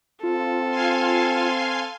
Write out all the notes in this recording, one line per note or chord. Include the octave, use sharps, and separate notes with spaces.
C4 F4 A4
F5 G#5 C6